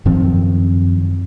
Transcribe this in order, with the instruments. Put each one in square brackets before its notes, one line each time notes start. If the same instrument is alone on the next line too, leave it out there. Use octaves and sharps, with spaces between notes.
[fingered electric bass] F#2 D#3 F3 C4